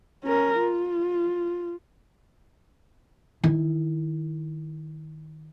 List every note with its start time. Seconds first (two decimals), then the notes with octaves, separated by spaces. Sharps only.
0.24 C#4 A#4
0.59 F4
3.44 D#3 E4